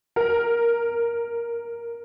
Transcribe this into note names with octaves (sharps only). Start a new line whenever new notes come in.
A#4